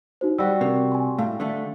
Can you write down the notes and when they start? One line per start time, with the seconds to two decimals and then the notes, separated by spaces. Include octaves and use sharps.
0.21 D#4 F#4 C5
0.38 G3 F#4 E6
0.61 C3 A#4
0.92 G#5 C6
1.18 A2 F5
1.40 D3 A3